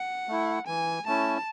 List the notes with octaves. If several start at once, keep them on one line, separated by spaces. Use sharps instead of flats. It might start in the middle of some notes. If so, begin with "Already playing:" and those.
Already playing: F#5
A3 E4
E3 G#5
A3 C#4 E4 A5